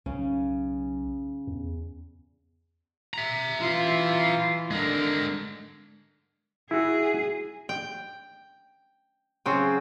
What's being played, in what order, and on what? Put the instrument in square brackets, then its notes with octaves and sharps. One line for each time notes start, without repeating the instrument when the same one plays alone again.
[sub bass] B1 [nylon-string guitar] C#3 C#4
[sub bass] E2
[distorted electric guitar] E5 A#5
[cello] E3 F4
[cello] D3 [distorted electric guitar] G#3 A#4
[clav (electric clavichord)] E4 F#4 [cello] G#4
[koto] G5
C#3 F#3 C4